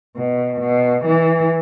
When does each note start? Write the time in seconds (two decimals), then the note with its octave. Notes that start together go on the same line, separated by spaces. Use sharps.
0.17 B2
0.61 B2
1.05 E3